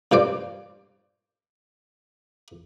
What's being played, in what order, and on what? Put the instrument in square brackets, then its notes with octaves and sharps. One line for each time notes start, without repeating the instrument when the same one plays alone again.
[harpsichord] G2 A#2 C5 D5